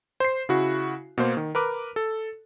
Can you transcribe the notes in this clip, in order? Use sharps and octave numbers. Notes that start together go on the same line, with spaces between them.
C5 C7
C#3 E4 F#4
B2 A#3 C5
D#3
A#4 B4 D6
A4